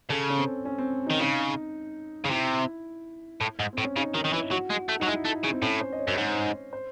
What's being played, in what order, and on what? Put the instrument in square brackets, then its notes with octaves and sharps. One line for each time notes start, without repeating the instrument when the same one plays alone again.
[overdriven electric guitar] C#3 [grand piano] A4
[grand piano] C#4
C4
C#4
C4
[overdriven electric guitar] D#3 [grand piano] D#4
[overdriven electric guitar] C#3 [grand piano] D#4
[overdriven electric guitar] C#3
[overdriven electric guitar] C3 [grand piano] E4
[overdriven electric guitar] A2
G#2
[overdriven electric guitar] A2 [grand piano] C4
[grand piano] C#4
[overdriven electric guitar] C#3 [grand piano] D#4
[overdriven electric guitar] D#3 [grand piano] D#4
[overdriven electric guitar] D#3
[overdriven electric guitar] E3 [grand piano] E4
[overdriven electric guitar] F#3 [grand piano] F#4
[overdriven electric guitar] G#3
A3
[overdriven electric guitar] F#3 [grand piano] D#4
[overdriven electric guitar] G#3 [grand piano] E4
[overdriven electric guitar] A3
C#3
[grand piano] C4
[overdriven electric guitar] A2 [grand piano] C#4
[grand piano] C5
D#5
C#5
[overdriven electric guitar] F#2
G#2
[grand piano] C5